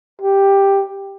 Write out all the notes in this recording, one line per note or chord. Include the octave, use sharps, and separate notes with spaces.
G4